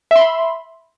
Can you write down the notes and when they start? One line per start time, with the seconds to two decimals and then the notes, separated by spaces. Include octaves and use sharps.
0.11 E5
0.16 C6
0.20 B5